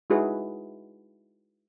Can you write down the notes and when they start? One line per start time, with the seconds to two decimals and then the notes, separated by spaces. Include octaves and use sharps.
0.10 G#3 D#4 E4 F#4 G#4 B4